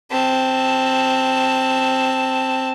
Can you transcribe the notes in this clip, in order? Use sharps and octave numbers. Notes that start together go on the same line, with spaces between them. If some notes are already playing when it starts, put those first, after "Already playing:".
C4 A5